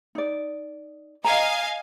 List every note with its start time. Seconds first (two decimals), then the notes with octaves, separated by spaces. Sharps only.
0.15 D#4 D5
1.24 D#5 F5 G#5 A#5